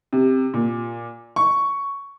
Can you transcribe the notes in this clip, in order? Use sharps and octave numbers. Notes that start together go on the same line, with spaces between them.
C3
A#2
C#6